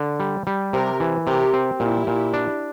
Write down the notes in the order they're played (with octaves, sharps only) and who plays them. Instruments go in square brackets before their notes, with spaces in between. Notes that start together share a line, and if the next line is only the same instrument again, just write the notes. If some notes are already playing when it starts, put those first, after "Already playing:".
Already playing: [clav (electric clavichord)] D3
G3
G3
[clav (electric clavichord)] C3 [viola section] G4 A#4
[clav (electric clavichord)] E3
[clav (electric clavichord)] C3 [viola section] G4 A#4
[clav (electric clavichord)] C4
[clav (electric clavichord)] A#2 [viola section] E4 G4
[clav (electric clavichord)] A#2
D4